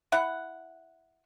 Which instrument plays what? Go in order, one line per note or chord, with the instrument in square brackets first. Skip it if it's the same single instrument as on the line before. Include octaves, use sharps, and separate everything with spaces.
[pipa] E4 F#5